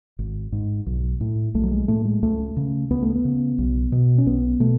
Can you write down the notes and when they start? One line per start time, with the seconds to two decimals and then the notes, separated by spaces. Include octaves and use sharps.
0.19 G#1
0.52 G#2
0.86 B1
1.21 A2
1.54 B1 A3
1.63 F#3
1.71 G#3
1.88 A2 A3
2.05 G#3
2.22 C#2 A3
2.57 C#3
2.90 C#2 B3
3.02 A3
3.15 B3
3.25 C#3
3.58 B1
3.92 B2
4.18 C#4
4.26 B1 B3
4.60 B2 A3